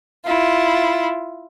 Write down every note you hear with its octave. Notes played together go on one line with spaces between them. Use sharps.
E4 F4